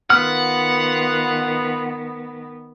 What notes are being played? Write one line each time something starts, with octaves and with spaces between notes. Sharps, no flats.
D#3 B3 F4 B4 F#5 F6